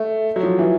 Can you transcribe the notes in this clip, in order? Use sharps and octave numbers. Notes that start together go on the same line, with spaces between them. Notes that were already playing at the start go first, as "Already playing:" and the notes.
Already playing: A3
F#3
F3
E3